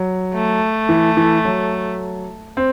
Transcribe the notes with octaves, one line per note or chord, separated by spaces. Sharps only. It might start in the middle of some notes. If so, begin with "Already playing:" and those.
Already playing: F#3
A3
E3
E3
F#3
C4